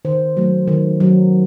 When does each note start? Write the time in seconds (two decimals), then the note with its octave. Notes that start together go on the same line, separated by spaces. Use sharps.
0.05 D#3 C5
0.37 F#3 A3
0.68 D#3
1.00 F#3